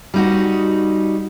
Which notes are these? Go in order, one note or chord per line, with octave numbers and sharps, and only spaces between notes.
G3 D#4 F#4